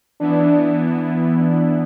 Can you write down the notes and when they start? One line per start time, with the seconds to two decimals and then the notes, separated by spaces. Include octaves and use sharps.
0.20 E3 B3 D4 E4
1.37 D4